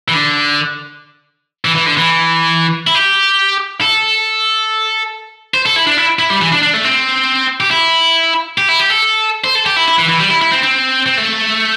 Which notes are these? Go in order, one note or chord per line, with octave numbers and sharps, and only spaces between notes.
E3
D3
E3
E3
D3
E3
E4
G4
A4
C5
A4
E4
D4
E4
E4
G3
E3
D4
D4
A3
C4
G4
E4
G4
E4
G4
A4
C5
A4
G4
E4
E4
E3
E3
G3
E4
E4
C4
C4
C4
A3